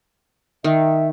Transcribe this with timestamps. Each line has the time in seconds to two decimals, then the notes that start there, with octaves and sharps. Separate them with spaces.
0.64 D#3 E5